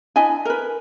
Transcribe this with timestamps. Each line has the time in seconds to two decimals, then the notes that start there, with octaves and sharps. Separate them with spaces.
0.16 D4 E4 D#5 G#5
0.45 A#4 B4